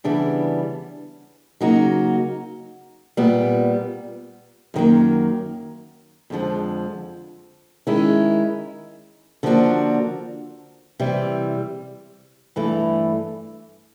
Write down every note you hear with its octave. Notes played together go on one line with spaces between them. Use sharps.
C#3 E3 G3 B3 D4
C#3 F#3 A#3 D#4 F#4
A#2 G3 B3
F#2 D#3 F#3 A#3
F2 D3 F3 G#3
D#3 G#3 C#4 E4
D3 F3 A#3 D4 F#4
C3 E3 G3
G2 E3 A3